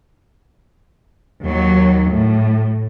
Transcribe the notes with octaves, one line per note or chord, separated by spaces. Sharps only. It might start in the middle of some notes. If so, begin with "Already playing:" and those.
D#2 F#3
A2